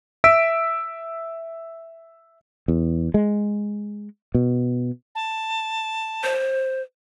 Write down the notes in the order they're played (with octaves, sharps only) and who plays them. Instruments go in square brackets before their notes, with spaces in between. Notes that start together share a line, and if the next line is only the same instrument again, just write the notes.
[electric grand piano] E5 E6 B6 D7
[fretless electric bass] E2
G#3
B2
[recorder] A5
[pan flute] C5